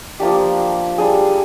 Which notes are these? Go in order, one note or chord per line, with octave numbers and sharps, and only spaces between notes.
F3 A#3 D4 G4
G3 D4 G#4